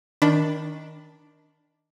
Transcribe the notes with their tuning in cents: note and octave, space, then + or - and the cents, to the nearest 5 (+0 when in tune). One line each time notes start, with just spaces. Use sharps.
D#3 +15 D4 +0 B5 +15